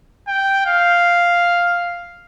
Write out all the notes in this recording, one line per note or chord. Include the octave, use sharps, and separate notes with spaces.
G5
F5